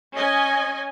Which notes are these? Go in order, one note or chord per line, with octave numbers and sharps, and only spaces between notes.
C#4 D#5 G#5